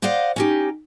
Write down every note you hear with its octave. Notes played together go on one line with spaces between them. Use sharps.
C5 D5 D#5 F5 F#5
C#4 D#4 G4